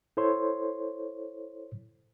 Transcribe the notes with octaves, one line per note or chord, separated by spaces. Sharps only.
E4 A4 C5 C#5 C6